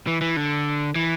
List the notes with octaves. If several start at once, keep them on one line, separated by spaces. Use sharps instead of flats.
E3
E3
D3
E3